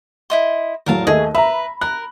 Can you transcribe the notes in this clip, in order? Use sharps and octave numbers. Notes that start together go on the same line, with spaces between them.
E4 D#5 C6
E2 A2 F#3 A#4 F5 A5
D#2 A3 G#4 D#5 E5
B4 E5 A#5 B5
A#4 F#6